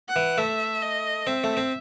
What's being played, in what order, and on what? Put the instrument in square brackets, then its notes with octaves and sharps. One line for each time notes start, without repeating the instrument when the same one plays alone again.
[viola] F#5
[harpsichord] E3
[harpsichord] A3 [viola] E5
[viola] D#5
[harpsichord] C4 [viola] E5
[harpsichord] A3
C4